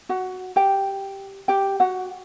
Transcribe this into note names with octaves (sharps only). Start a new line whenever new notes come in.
F#4 F#5
G4 G5
G4 G5
F#4 F#5